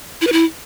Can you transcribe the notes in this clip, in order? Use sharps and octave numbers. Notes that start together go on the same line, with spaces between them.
E4
B4
E4